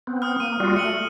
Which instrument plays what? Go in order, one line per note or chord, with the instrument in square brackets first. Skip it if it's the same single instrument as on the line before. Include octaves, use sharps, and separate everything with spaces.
[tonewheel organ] B3 C4
[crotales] D#6 F6
[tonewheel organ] A#3 [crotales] D#7
[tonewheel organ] G3 F4 F#4
[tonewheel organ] A3 [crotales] C#7 D#7 F#7